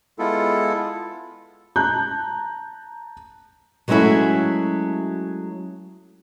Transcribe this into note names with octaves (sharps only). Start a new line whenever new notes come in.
G#3 B3 E4 F4 A4
A5 A#5 F#6 G6
F#3 G#3 A3 C#4 E4 F#4